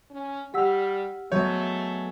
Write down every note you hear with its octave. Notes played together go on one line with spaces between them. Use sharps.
C#4
G3 G4 F#5 E6 F6 B6
F#3 G#3 A3 B3 C#5 G6